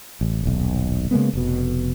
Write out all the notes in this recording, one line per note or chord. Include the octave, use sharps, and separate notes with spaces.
A1
D#1 B1
C#3 G#3 A#3 B3
F1 B2